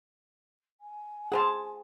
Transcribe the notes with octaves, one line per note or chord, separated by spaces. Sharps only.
G#5
G#4 C5 F#5 A5 A#5 C6